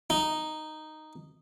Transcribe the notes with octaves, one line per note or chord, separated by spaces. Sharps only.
D#4